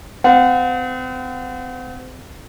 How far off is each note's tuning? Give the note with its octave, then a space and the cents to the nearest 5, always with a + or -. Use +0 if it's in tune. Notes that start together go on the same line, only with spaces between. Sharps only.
C4 -40 F#5 -35